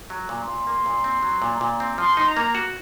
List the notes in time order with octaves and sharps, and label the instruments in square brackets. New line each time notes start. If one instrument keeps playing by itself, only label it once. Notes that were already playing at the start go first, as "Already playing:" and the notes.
[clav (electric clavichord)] F#3
[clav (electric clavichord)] A#2 [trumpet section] C6
[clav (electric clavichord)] A#2
A#3
A#2
C4
F#3
A#2
A#2
C4
[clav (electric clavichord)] F3 [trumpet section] C6
[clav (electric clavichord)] D#4
[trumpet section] A#5
[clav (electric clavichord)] A#3
F#4